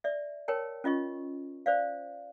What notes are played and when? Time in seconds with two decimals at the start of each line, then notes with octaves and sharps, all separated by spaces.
0.04 D5 E5
0.48 A#4 C#5 G5 A5
0.84 C#4 F4 D#5 C#6
1.66 C5 D5 F5